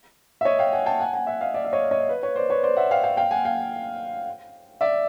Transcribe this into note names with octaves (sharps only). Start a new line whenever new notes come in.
E5
C#5 D#5
F5 G5
F#5 G#5
G5 A5
F#5 G#5
F#5 G#5
E5 F#5
D#5 F5
D5 E5
E5
C#5 D#5
C#5 D#5
B4
B4 C#5
C5 D5
B4 C#5
C5 D5
E5 F#5
F5 G5
F5 G5
F5 G5
F#5 G#5
F5 G5
D5 E5